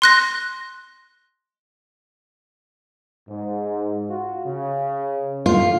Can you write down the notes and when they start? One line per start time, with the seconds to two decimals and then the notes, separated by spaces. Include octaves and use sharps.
0.02 C6 F#6 A#6
3.27 G#2
4.09 F4 F#4
4.46 C#3
5.46 A2 D3 F4